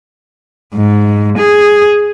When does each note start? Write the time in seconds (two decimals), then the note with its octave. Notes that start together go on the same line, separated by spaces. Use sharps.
0.75 G#2
1.38 G#4